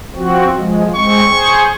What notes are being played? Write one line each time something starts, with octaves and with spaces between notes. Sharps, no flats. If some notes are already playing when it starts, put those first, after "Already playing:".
F3 C4 F#4
F3 G#3
G#3 C4 C#6
G#4 C5